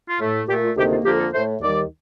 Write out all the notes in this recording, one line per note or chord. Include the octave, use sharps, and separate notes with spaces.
F4
A2 A3
A#2 A3 G4
F4
D2 C3 D#3 A#3 G4
F4
F2 D3 F3 A#3 G4
A4
A2 A3 C5
D#2 D#3 G3 D5